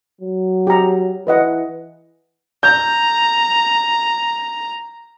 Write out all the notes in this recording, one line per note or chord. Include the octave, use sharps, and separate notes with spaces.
F#3
G4 A#5
E3 B4 D#5 F#5
A#5 G6